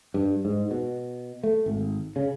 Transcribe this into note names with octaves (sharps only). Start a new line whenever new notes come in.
G2
G#2
B2
A3
G#1
C#3